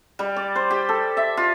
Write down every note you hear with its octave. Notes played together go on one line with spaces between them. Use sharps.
G3
D5
C5
G4
A4
E5
F4